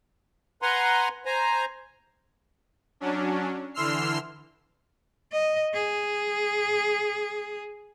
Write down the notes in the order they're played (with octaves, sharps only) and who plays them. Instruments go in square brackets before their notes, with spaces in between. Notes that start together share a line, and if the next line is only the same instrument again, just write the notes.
[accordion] B4 F#5 G#5 A#5 C6
C5 G#5 A#5
[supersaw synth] F#3 C#4 D4
D3 E3 C6 E6 F6 C7
[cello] D#5
G#4